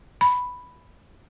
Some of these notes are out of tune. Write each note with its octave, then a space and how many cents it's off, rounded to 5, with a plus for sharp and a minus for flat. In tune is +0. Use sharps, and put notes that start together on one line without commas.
B5 +5